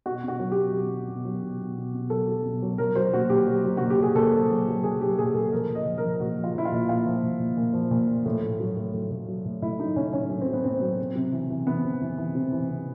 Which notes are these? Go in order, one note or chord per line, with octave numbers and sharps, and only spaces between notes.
B2 F#4
B2 F#4
F#3
G4
B2
B2
B2
B2
F#3
B2
B2
B2
B2
F#3 A4
F#3
B2
F#3
F#3 A#4
F#3 C5
A#2 F#4
A#2 G4
F#3
F#3
A#2 F#4
G4
F#3 G#4
A#2 A4
F#3
F#3
F#3
F#3 G#4
F#3 G4
A#2 G#4
A#2 A4
F3 A#4
F3
D#5
F3
A#4
F3
A#2 F#4
F3
F4
F3 E4
F4
A#2
A#2 F4
F3
A#2
A#2
A#2
F3
A#2
F3
A2
A2
F#3
A2
A2
A2
F#3
A2
A2 E4
F#3 D#4
A2 C#4
A2 C#4
F#3 C#4
C4
F#3
B3
A2 C4
F#3
C3
C3
E3
E3
E3 B3
C3
E3
E3
C3
E3
C3